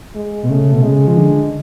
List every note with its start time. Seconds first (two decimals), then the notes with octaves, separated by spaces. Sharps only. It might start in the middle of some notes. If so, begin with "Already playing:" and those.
0.15 G#3
0.43 B2
0.49 C#3 A3
0.72 B2
0.83 C#3 G#3
1.07 F3
1.18 D3